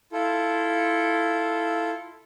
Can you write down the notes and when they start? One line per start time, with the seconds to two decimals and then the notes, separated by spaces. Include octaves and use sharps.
0.12 E4 F4 A4